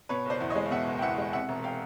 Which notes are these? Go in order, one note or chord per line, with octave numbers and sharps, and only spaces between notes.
B2 B4 C#5
F#1 C5 D5
E2
C#5 D#5
G#3
F5
B2 E5 F#5
F#1
G5
E2 E5 F#5
G#3
C3 E5 F#5
E1
F5 G5